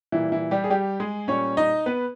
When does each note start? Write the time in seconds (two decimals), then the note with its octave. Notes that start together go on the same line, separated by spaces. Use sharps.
0.12 A#2 E3 G3 E4
0.32 E3 E4
0.51 G3 G4
0.64 G#4
0.70 G3 G4
1.00 G#3 G#4
1.28 A#2 G3 C#4 C#5
1.57 D#4 D#5
1.86 B3 B4